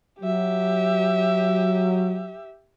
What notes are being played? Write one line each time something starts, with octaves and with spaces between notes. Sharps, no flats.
F#3 G4 E5